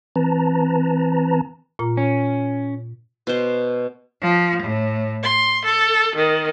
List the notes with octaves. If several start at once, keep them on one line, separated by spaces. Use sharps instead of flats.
E3 C4 B4 A5 A#5
A#2 F4 A#5
C#4
B2 C5
F3
A2
C6
A4
D#3